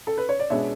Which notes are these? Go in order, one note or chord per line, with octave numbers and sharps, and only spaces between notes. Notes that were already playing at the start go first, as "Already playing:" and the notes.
A4
B4
C#5
D5
B2 G#3 B3 D4 C#5 E5